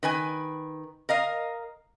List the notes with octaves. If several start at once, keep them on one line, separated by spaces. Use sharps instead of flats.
D#3 B4 G#5
A#4 D#5 F5